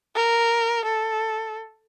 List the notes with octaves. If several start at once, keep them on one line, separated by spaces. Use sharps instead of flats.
A#4
A4